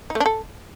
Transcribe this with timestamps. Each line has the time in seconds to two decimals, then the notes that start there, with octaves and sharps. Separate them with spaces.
0.10 D#4
0.15 A3
0.20 D4
0.26 A4